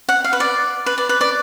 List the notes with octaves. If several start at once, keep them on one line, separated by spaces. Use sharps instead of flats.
F#5
F5
B4
D5
B4
D5
B4
D5